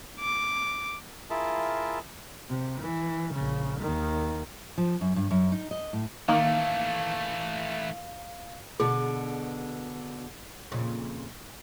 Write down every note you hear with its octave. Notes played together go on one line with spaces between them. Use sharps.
D6
E4 F4 G#4 A#4 E5 A5
C3
E3
A#1 C#3
D#2 D#3
F3
F#2
G2
F#2
D#4
D#5
A2
D#3 E3 A3 A#3 F5
B2 D3 D4 G#4
F2 A#2 C#3